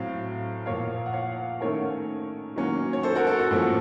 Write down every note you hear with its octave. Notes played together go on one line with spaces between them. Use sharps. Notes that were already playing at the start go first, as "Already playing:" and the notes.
Already playing: A2 F#3 C4 F5
A#2 F3 A#3 C#5 F5
F#5
C#5 F5
D#3 A3 C#4 A#4 C#5
D#3 F#3 A#3 C#4
C#5
A4 C5
F#4 A#4
A4
F#4
A2 F3 A#3 C#4 A4